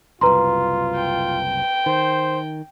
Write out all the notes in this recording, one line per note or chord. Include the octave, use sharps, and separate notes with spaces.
F#1 C2 F4 B4 A#5 C6
G5
D#3 C5